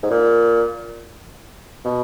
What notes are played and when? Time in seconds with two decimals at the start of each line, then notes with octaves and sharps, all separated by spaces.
0.03 G#2
0.10 A#2
1.85 B2